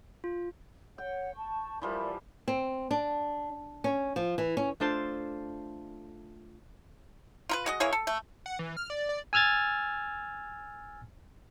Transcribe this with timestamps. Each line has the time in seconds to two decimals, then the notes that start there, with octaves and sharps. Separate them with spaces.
0.24 F4
0.98 C#5 F#5 G5
1.35 A5 C#6
1.82 E3 F3 G3 A#4 D5 E5
2.48 C4
2.91 D4
3.84 C#4
4.16 F3
4.38 E3
4.57 C#4
4.80 A3 D4 F4 C5 A5
7.49 F4 A#4 B4
7.66 G#3 F#4 D#5
7.80 E3 A#3 G#4 C#5
7.93 A4
8.07 A3
8.46 F#5
8.59 E3
8.77 F6
8.90 D5
9.09 D5
9.33 G#5 E6 F6 G#6 A6